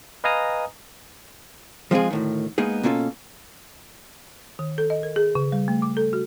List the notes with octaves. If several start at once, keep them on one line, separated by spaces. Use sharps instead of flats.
B4 D#5 F5 G#5 A#5 D#6
F3 G#3 B3 C4 F4 G#4
D2 A2 D#3
G#3 A#3 B3 D#4 G#4
B2 A#3 C#4 F4 G#4 A4
D#3
A4
D#5
A#4
G#4
C#3
G3
A3
D6
A4
F#4